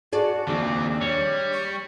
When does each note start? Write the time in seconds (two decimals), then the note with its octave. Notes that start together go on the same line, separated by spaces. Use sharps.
0.12 F#4 G#4 D5 A5
0.47 D#2 F3 C4 D4 D6
1.01 G3 C#5
1.53 C#6